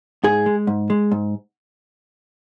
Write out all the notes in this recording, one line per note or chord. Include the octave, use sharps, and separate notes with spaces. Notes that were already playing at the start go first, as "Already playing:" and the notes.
G#2 G#4
G#3
G#2
G#3
G#2